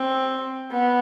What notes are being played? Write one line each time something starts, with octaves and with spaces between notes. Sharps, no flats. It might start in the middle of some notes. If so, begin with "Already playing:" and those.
Already playing: C4
B3